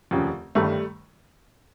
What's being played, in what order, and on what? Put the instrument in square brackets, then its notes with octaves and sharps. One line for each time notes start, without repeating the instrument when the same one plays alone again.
[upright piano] F1 D#2 C#3 F3
G1 G2 D#3 G3 A3